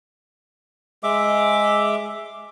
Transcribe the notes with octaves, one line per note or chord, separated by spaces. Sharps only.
G#3 E5 D6